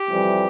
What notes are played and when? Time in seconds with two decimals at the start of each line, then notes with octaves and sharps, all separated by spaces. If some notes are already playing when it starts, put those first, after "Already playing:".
Already playing: G4
0.09 F2 C3 E3 G3